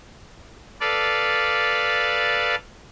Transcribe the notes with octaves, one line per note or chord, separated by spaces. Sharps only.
A4 B4 D5 F5